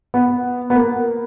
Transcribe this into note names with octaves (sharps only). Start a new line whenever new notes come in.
B3
B3
A#3